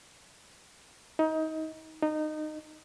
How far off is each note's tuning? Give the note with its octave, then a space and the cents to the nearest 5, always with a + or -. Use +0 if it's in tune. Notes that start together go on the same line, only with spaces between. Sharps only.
D#4 +25
D#4 -20